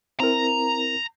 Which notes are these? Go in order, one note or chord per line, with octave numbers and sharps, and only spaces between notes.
C4 E4 A#4 A#5